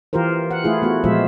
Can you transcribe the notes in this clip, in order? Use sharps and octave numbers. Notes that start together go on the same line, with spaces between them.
E3 F4 G4 A#4 C5
F#5
A3 E4 F4 G#4
A3 B3 F#4
A#2 F3 G#3 F4 C5 E5